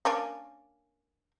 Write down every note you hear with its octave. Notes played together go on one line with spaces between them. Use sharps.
A#3 C#4 D4